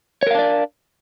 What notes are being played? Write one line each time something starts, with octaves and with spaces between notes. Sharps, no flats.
D4 A#4 C#5 D5 F5